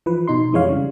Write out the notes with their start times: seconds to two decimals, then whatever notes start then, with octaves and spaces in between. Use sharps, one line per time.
0.06 E3 F3 B4
0.28 B2 D#4 C6
0.53 F2 E3 G#3 C#5 F5
0.66 C#3 G3